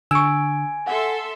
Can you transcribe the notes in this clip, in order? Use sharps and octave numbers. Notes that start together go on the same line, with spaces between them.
D3 G#5 C#6 E6 G#6 D7
A4 E5 F#5 C6